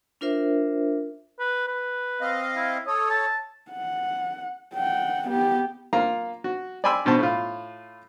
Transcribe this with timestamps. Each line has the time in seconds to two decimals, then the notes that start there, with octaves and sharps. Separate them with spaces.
0.21 D4 F4 A#4 C5 E5
1.40 B4
1.68 B4
2.21 C4 D#5 F5
2.56 E4
2.87 A4 C#5 D#6
3.11 A5
3.71 F#5
4.74 F#5 G5
5.28 B3 G4
5.93 A#3 F4 F5 A#5
6.44 F#4
6.84 D5 G5 G#5 B5 C6 E6
7.05 G2 B2 B3 C5 A5
7.19 A2 F4